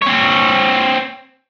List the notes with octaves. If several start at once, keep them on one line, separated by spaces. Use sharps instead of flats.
C4 C#5